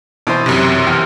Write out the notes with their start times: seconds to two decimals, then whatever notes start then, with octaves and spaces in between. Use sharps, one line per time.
0.27 B2 E3 C5
0.46 F#2 C3
0.87 E2 F6